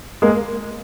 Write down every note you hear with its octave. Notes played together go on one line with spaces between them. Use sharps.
G#3 A#3